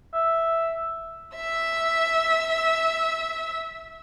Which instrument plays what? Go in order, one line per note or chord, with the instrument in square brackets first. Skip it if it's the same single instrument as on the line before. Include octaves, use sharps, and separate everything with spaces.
[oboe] E5
[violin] E5 E6